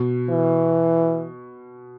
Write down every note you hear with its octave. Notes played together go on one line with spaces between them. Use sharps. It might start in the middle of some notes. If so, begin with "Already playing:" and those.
Already playing: B2
E3